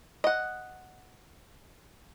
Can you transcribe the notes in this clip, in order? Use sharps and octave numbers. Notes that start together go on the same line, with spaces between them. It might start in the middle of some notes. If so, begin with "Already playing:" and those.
D#5 F#5